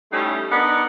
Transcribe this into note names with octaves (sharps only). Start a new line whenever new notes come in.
G3 A3 C#4 D#4 E4
B3 D4 D#4 A#4